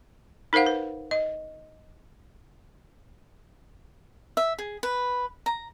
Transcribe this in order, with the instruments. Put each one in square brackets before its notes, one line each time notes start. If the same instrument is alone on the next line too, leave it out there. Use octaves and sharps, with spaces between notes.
[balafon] D#4 A#4 C5 F5 F#5
B4
D#5
[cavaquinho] E5
G#4
B4
A#5